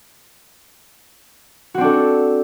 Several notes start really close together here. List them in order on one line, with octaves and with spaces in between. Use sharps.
F#4 C4 D4 A4